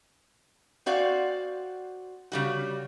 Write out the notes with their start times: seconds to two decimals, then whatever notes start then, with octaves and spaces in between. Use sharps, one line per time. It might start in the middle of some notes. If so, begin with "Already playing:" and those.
0.86 C4 F#4 D5 F5 F#5
2.32 C#3 G3 F#4